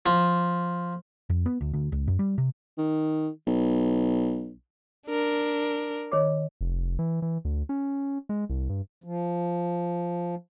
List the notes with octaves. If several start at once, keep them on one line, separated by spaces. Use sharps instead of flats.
F3
F2
B3
D2
D2
C#2
F#2
G3
C3
D#3
B1
D4 A#4
D#3 C#5 D6
F1
E3
E3
D2
C#4
G#3
C2
G2
F3